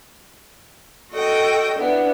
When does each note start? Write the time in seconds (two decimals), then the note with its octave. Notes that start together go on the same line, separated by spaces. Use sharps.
1.12 F#4 A4 D#5 G5
1.79 B3 D4 E4